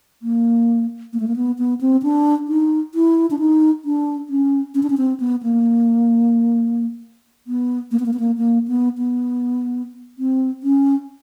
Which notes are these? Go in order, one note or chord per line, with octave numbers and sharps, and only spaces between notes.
A#3
A#3
A3
A#3
B3
B3
C4
D4
D#4
E4
D4
D#4
D4
C#4
C#4
D4
C#4
C4
B3
A#3
B3
A#3
B3
A#3
B3
A#3
A#3
B3
B3
C4
C#4